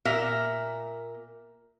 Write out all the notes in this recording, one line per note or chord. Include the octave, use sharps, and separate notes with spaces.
A#2 A#4 E5